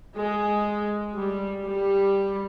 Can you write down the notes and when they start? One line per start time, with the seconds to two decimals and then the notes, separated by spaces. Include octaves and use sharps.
0.18 G#3
1.16 G3
1.67 G3